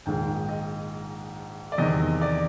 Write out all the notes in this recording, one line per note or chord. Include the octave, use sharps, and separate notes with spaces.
A#1 G#2 D#3 G#3 G5
D#5
D5
E2 C3 D#3 D#5
D5